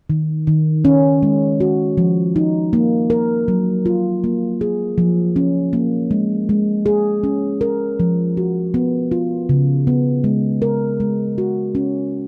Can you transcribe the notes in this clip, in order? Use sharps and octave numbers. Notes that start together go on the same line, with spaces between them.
D#3
D#3
C#4
G#3
F#4
F3
D#4
A#3
A#4
F#3
F4
A#3
G#4
F3
C#4
A#3
G#3
G#3
G#4
C#4
A#4
F3
F#4
B3
F4
C#3
B3
G#3
A#4
G#3
F#4
C#4